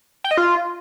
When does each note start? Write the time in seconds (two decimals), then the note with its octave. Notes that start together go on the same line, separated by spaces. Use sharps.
0.24 G5
0.31 D#5
0.37 F4